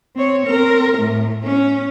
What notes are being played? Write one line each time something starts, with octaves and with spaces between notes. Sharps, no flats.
C4 C#5
C4 A#4
A2 A3
C#4